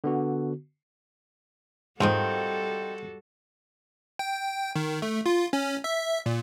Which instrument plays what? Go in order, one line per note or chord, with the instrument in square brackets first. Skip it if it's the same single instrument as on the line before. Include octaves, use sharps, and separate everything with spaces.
[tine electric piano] D3 B3 F#4
[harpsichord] G#2 [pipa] D#3 F3 C4 [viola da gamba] G3 F#4 A4
[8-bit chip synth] G5
D#3
A3
F4
C#4
E5
A#2